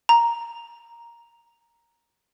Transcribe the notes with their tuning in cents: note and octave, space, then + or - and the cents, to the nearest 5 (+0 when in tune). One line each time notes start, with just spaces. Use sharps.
A#5 +5